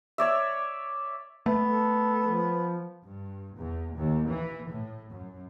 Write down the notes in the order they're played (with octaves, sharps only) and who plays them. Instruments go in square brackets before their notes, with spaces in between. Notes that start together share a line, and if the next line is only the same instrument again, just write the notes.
[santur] C#5 D5 E5
[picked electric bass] A3 [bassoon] B3
[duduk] A4
F3
[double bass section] G2
E2
D#2
E3
A2
F#2